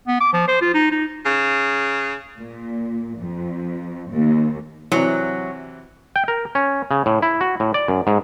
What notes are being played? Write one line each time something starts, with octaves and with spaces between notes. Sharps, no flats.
B3
D6
F3
C5
F4
D#4
D#4
C#3
A#2
F2
D#2
C3 E3 F#3
G5
A#4
C#4
C#3
A2
E4
F#4
A2
D5
F#2
G#2